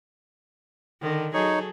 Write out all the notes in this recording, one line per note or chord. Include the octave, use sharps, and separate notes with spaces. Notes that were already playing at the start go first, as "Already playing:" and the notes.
D3 D#3
F#3 D#4 G#4 A4 C#5